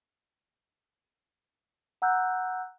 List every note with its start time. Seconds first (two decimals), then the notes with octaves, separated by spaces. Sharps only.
2.02 F#5 A#5 E6 F#6 G6